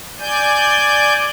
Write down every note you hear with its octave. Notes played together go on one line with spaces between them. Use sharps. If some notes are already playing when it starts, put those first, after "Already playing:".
D5 G#5 G6